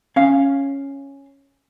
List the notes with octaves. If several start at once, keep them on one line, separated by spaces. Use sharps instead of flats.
C#4 F5